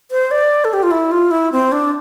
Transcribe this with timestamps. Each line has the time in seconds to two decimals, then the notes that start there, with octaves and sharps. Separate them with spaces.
0.11 C5
0.31 D5
0.65 A4
0.73 G4
0.83 F4
0.91 E4
1.12 F4
1.31 E4
1.52 C4
1.72 D4